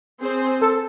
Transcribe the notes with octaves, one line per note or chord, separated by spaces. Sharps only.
C4 G#4 C5
A4